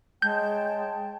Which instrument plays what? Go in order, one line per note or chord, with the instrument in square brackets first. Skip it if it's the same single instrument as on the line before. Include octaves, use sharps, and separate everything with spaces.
[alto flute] G#3 [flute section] C#5 G5 A5 [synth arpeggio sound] G6